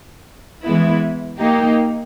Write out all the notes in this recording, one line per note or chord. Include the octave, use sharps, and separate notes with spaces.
E3 G#3 B3 E4
A#3 D#4 G4